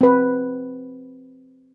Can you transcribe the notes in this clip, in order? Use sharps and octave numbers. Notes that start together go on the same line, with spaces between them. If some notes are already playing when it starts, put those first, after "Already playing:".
C4 B4